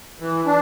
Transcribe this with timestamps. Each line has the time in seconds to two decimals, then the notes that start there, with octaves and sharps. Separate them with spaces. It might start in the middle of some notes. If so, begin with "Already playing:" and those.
0.20 E3
0.46 D4